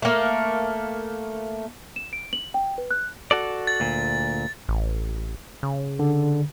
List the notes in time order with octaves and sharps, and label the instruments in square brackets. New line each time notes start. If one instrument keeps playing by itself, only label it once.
[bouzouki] A3 A#3
[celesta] E7
D7
F#7
G5
B4
F#6
[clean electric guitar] F#4 A4 D5
[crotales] A6
[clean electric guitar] D2 A#2
[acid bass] A1
C#3
[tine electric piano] D3